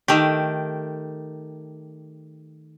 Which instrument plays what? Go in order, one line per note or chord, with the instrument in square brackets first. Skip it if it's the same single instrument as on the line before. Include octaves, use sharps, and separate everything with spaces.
[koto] D#3 A3 G4